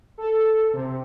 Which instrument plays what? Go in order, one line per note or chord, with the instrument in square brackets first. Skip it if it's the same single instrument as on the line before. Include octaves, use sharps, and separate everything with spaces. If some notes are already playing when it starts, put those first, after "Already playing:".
[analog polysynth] A4
C3